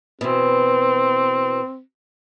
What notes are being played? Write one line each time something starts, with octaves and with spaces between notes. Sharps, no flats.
B2 E3 C4